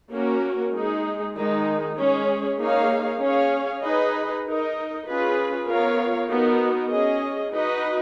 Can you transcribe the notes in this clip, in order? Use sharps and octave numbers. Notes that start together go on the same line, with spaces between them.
A#3 C#4 F#4 A#4
G#3 D#4 G#4
D#3 G#3 D#4
G#3 C#4 G#4 C#5
A#3 D#4 G#4 C#5 F5
C#4 G#4 C#5 F5
D#4 G#4 B4 D#5
D#4 A#4 D#5
C#4 F4 G#4 B4
B3 F4 A#4 C#5 F5
B3 D#4 F#4 A#4
C#4 G#4 D#5
D#4 F#4 B4 D#5